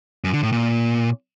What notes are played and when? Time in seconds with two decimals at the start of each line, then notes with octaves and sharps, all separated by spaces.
0.24 F#2
0.34 D3
0.43 A2
0.52 A#2